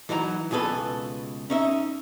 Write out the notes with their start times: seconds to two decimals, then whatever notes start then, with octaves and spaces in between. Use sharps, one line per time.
0.09 E3 F#3 D#4 A#4 A#5
0.51 C#2 B2 G#4 A4 B4
1.50 C#4 D#4 E5